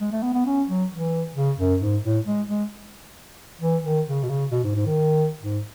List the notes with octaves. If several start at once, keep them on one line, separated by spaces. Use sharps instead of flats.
G#3
A3
B3
B3
C#4
F#3
E3
C#3
F#2
G#2
A2
G#3
G#3
E3
D#3
C#3
B2
C#3
B2
G#2
G#2
D#3
G#2